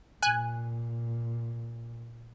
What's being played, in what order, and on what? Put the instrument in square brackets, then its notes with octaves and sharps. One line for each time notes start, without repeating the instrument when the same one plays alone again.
[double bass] A#2 [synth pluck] G#5 F#6